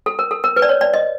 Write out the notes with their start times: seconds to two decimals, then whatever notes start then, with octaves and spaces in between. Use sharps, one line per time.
0.06 A4
0.19 A#4
0.31 A4
0.44 A#4
0.56 B4
0.62 D5
0.69 C#5
0.81 D5
0.94 D#5